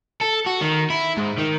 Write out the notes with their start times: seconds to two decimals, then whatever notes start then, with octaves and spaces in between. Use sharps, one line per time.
0.21 A4
0.46 F#4
0.61 D#3
0.90 E4
1.18 G#2
1.39 D#3